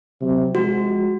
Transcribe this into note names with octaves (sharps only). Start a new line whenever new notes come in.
C3 F#3
F3 G#3 F#4